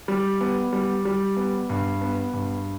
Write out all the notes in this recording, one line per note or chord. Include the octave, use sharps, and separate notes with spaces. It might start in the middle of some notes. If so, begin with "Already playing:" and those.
G3
B3
G3
G3
B3
G2
B3
G2